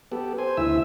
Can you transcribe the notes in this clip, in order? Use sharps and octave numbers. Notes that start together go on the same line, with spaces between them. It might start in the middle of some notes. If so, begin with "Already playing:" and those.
B3 G4 A4
C5 G#5
D2 E4 E5 E6